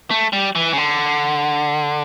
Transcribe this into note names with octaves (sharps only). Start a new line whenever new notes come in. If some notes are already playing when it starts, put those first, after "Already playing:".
A3
G3
E3
C#3
D3